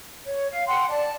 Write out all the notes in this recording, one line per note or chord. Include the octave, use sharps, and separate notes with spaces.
C#5
F5
F#5 G5 C6
D5 A5